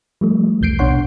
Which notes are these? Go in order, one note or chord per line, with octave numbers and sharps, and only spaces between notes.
F3 G3 A3
B1 E2 G6 C7 D7
C2 B2 D4 C#5 F#5 C6